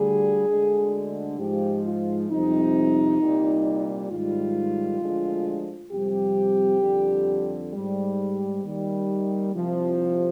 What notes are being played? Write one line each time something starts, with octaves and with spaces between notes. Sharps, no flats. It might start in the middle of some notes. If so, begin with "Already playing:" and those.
Already playing: D2 D3 G3 G#4
D2 D3 G#3
G#2 F3 G#3 G4
F4
F2 C3 G3 D#4
C2 A#2 G3
G#2 D#3 G3 F4
D2 D3 F3 G#3
F2 C3 G3 G4
F2 D3 G3
G#2 G3
D#2 D#3 G3
C2 C3 F3